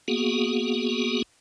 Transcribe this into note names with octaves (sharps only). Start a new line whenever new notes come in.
A#3 B3 F#4 G#4